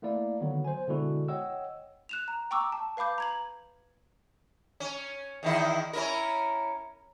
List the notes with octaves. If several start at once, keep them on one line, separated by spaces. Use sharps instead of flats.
A3 A#3 E4 D5 F5
D3 D#3 F#3 B3
C5 G#5
B2 D3 G#3 B3 E4 F#4
C#5 D#5 F#5 G5 E6
F#6 E7 F7
A#5
G5 A#5 C#6 D6 E6
A5
B4 F5 B5 D6 G6
A#5 G#6 F#7
C#4
E2 D#3 E4
C#4 E4 A#4